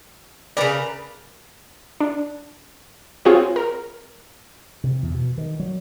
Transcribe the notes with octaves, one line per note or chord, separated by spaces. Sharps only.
A#2 C#3 A#4 B4 D5 A#5
D4
C4 F4 F#4 G#4 C#5
A#4
C3
E2
B2
D#3
F#3